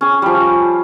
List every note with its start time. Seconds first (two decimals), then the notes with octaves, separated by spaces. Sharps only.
0.01 C#4 G#4
0.22 F3 G3